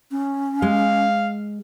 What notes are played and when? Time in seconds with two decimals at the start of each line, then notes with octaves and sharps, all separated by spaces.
0.11 C#4
0.62 G#3 F5